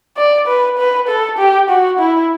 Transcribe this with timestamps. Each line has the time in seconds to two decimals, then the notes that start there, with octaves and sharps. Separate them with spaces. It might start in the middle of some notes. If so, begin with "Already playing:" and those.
0.17 D5
0.47 B4
0.78 B4
1.08 A4
1.38 G4
1.70 F#4
1.99 E4